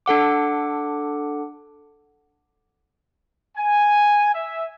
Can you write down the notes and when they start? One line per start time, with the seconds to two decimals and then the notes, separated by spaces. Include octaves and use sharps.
0.06 D4 A4 F#5 D6
3.58 G#5
4.35 E5